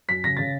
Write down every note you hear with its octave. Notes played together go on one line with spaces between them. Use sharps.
F#2 B6
C#3 A#6
C#3 A6